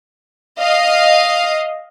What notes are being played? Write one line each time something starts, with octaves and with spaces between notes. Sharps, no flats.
D#5 F5